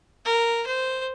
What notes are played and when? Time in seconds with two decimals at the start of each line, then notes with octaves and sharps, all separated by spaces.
0.25 A#4
0.66 C5